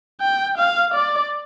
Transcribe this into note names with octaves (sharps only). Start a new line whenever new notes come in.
G5
F5
D5